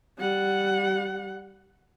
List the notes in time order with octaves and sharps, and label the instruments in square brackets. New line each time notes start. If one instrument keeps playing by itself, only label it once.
[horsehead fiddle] G3 F#5